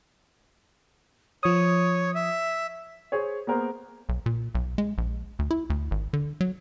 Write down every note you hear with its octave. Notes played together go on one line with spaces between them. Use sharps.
F3 C#5 D#6
E5
G#4 C5 C#5
A#3 B3 G#4 A#4 C5
B1
A#2
B1
G#3
A#1
D2
E4
D2
G#1
D3
F#3